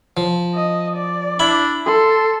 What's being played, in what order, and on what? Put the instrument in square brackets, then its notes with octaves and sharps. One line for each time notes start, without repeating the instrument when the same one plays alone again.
[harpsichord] F3
[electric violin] D#5
D5
[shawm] D4 [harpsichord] E4 B5
[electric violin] A4 [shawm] C6